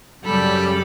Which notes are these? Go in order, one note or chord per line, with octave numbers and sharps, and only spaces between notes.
F#2 C#3 G3 A4 B5